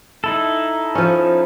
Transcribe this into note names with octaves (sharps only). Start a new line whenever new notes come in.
D#4 E4 A4
F3 C#4